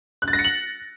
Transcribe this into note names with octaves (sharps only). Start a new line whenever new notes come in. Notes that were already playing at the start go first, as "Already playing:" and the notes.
F#6
A6
A#6
C#7
F#7